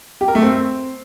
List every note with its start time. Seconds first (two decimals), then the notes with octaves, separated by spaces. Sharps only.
0.21 G4
0.28 A#4
0.35 A3
0.42 C4